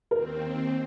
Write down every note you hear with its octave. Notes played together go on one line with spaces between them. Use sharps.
D#2 C4 A#4